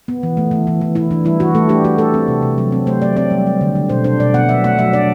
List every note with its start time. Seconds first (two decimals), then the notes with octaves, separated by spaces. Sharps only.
0.08 B3
0.23 E3
0.37 A3
0.51 E3
0.67 E3
0.81 E3
0.95 E3 E4
1.11 E3 D4
1.25 G3 E4
1.40 E3 F#4
1.55 A3 A4
1.69 D4 G4
1.84 A3 F#4
1.98 A3 A4
2.14 C4
2.28 C3
2.42 C3
2.58 F#3
2.72 C4
2.87 A3 C5
3.02 F#3 D5
3.16 C4 D5
3.31 G3
3.47 G3
3.61 D3
3.75 D3
3.89 B2 C5
4.04 D4 C5
4.20 B2 D5
4.34 B3 F#5
4.49 F#3 E5
4.64 A3 F#5
4.78 F#3 E5
4.93 D4 D5